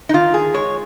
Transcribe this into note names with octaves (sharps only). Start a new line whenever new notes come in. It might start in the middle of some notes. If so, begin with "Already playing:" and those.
D#4
D#3 F4
G#4
G#3 C#5